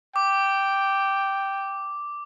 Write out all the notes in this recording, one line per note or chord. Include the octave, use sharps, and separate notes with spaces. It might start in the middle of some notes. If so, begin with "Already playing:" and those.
G5 D6